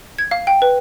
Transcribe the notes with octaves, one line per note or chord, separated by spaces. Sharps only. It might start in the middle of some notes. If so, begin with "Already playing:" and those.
G#6
F5
G5
B4